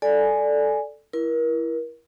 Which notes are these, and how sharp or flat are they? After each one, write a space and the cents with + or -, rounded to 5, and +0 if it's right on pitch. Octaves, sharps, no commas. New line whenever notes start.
A4 +0 D5 +0 G#5 +0
E4 +15 A#4 +35